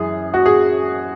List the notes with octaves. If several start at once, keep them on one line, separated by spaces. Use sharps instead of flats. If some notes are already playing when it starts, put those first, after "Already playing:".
Already playing: F#2 E3 G#4
F#4
G#4